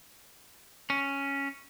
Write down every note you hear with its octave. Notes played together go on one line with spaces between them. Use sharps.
C#4